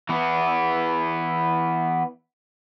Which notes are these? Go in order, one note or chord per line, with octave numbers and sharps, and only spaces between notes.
E3 B3